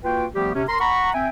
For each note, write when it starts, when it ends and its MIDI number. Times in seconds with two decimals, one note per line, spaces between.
0.04 0.25 58
0.04 0.25 65
0.04 0.25 66
0.04 0.25 71
0.04 0.25 79
0.35 0.52 53
0.35 0.52 55
0.35 0.52 57
0.35 0.52 59
0.35 0.52 67
0.54 0.63 48
0.54 0.63 61
0.68 0.80 70
0.68 0.80 82
0.68 0.80 84
0.80 1.12 78
0.80 1.12 82
0.80 1.12 83
0.80 1.12 85
1.14 1.28 60
1.14 1.28 76
1.14 1.28 79
1.14 1.28 80